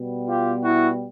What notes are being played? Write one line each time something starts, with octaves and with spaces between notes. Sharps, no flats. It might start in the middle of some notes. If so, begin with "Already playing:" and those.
Already playing: B2 G3 B3
F4 G4
E4 F#4